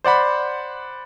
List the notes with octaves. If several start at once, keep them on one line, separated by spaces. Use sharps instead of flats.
C5 D5 F#5 B5